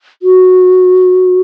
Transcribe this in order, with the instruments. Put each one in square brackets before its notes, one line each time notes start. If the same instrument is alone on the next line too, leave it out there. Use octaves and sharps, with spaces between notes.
[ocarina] F#4